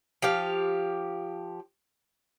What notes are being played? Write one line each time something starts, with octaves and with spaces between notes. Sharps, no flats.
F3 G4 F5